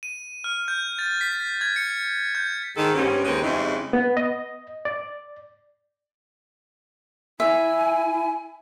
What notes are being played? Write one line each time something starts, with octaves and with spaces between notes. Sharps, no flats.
D#7
F6
G6
A6
B6
G#6
C#7
G6
G#2 D#3 A4
G2 C3 G3 B3 C#4
D#2 G#3 C4 C#4 B4 C5
F2 C#3 G3 G#3 D#4 E4
B3
D#5
D5
E4 E5 G#5